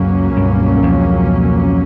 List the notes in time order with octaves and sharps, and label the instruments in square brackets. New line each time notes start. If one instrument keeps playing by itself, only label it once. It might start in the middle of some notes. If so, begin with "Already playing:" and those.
Already playing: [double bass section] C#2 B2 F#3 A#3 C#4 [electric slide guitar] F#2
[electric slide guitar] G2
F2